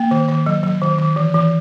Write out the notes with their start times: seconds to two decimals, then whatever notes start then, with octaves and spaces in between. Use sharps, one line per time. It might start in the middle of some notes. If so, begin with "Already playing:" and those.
Already playing: A#3
0.11 D#3
0.29 D#3
0.46 F#3
0.63 F#3
0.82 D#3
0.98 D#3
1.16 E3
1.34 E3